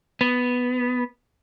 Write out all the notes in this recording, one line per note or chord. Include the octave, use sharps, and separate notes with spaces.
B3